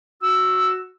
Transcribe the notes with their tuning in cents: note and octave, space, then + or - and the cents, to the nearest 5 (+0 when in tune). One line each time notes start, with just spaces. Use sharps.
F#4 +0 E6 +0